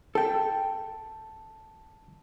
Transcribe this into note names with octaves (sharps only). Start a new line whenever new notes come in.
A4 G5 A5